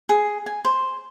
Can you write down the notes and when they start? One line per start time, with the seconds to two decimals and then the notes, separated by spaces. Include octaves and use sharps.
0.09 G#4
0.46 G#5
0.65 C5